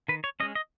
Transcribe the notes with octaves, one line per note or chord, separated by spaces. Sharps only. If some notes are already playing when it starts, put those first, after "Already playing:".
D#3 B4
C#5
G#3 C#4 D#5
D#5